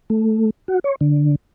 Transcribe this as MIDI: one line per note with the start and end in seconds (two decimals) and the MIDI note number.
0.10 0.50 57
0.68 0.79 66
0.84 0.95 73
1.01 1.36 50